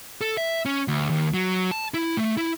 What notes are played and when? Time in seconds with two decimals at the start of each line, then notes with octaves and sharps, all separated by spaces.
0.21 A4
0.37 E5
0.65 C#4
0.88 D2
1.10 D#2
1.34 F#3
1.71 A5
1.94 E4
2.17 A3
2.37 E4